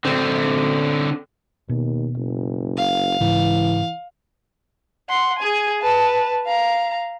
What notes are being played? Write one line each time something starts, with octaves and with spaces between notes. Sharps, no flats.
D3 C4
D#2 B2
F#1
F5
G#2 C#3 E3
F#5 C6
G#4 G#5
B4 A5
F5 A#5